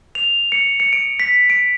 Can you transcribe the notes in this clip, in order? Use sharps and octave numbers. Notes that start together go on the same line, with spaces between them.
F7
C#7
C#7
D7
B6
D7